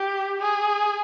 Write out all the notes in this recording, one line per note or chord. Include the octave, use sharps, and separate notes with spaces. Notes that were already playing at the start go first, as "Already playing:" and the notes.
Already playing: G4
G#4